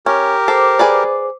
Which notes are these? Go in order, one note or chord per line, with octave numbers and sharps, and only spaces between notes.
C#4 G4 A#4
A4 C5 D6
G#4 B4 D5